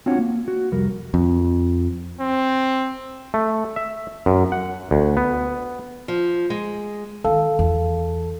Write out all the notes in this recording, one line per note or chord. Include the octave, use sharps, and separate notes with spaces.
C4 D4 F4 F#4 C#5 F#5
A#3
F#4
C2 F2 G3 A#4
F2
C4
A3
E5
F#2
F#5
D2
B3
F3
G#3
D#3 A4 F5
E2